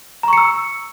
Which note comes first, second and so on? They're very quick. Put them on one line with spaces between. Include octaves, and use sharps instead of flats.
A#5 C#6 C#7 E6